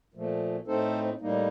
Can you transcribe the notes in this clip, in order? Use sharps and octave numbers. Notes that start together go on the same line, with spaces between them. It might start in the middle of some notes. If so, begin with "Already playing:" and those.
A#2 F3 A3
A2 A3 C4 D#4 A4 C5
A2 G3 A#3 D#4